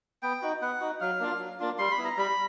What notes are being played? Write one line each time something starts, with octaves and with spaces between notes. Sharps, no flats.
B3 G5
D#4 F#4
B3 F#5
D#4 F#4
F#3 F5
A#3 D4 F4
F#3
A#3 D4 F4
G3 C6
B5
B3 E4
A#5
G3 B5